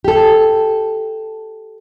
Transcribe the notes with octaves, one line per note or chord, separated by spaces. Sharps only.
G4 A4